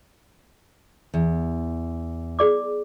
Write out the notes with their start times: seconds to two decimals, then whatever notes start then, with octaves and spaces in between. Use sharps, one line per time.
1.14 E2
2.39 G#4 D5 D6